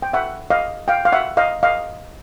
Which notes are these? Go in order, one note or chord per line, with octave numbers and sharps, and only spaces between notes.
G5
E5 F#5
D#5 F5
F5 G5
F5
E5 F#5
D#5 F5
D#5 F5